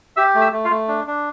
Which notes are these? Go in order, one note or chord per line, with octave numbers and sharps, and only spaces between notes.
G4 E5 E6
A3
E5 E6
A3
F4 F5
A3
D4
D4